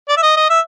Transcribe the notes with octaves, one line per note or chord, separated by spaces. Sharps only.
D5
E5
D#5
D#5
E5